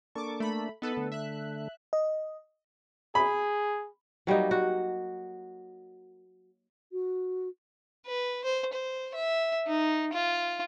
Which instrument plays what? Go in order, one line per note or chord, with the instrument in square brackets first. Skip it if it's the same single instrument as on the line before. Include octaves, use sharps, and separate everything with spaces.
[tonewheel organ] A#3 D4 A4 [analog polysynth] C#6 D6
[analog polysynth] A3 B5
[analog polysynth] B3 A4 B4 [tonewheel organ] D#4
[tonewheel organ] D3 A3
[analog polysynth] E5 F#6
[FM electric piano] D#5
[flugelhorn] G#4 [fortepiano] B5
[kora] F#3 G3 A#3 D#4
F#4
[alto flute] F#4
[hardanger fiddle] B4
C5
C5
E5
D#4
F4